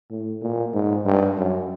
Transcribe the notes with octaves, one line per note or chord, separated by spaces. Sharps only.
A2
A#2
G#2
G2
F#2